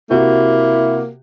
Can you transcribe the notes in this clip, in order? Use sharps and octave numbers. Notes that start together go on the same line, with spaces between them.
C3 A#3 E4 F#4 G4